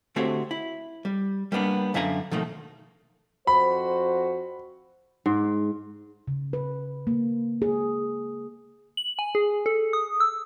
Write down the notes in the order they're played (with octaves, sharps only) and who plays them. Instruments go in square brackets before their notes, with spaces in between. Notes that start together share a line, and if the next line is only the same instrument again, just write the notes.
[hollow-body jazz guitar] D3 A3 C4 F#4 G4 C#5
E4
G3
G3 A#3 B3 D4
F#2 D3 E5 F5 G#5 A#5
B2 D#3 F3 A3 A#3
[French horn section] F2 F#4 C5 [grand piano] B5
[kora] G#2
[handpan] C#3
B4
A#3
G#4
[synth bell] F#7
G#5
G#4
A4
D#6
E6